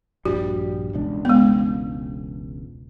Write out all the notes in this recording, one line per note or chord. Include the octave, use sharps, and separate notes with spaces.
A#1 G2 G3 F#4
E1 C#2 D4
G#3 B3